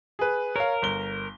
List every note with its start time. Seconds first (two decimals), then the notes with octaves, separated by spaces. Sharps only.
0.19 G#4 B4
0.56 A#4 C#5 F5
0.82 G1 G7